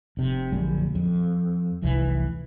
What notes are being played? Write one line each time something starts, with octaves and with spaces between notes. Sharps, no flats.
F1 C3
A#1 F#2 D3 G#3
F2
F1 C2 E3